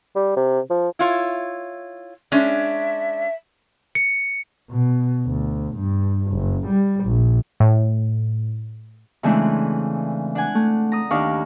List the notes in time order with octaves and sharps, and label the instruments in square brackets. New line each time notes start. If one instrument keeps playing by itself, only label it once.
[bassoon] G3
C3
F3
[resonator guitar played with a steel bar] E4 F4 C#5
[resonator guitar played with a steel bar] G#3 C#4 D4 [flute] E5
[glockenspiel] C#7
[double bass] B2
D2
G2
F#1
G3
A#1
[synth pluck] A2
[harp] C#3 E3 G#3 A3 C4 D4
D4 F#5 G#5
A3
A#5 D#6
D#2 D4 D5 F5 C#6